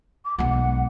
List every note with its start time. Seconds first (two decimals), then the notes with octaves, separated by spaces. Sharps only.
0.25 D6
0.38 B1 G#3 F#5